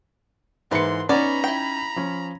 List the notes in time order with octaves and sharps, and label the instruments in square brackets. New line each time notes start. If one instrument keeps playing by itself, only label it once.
[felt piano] G#2 E3 C#7 [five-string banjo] A#3 E4 B4 [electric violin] C6
[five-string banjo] B3 D5 [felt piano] C#4 D#4 [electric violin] A#5 B5
[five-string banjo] E4 G5
[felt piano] F3 C#4